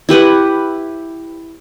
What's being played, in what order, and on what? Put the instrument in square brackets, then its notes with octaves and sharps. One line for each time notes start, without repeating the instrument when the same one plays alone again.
[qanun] E4 G4 B4 F#5